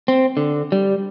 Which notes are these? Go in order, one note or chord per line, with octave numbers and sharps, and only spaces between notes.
C4
D3
G3